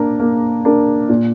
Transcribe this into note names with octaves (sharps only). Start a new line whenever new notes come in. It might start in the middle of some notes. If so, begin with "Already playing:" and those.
Already playing: A#3 D4 A#4
A#3
D4 A#4
A#2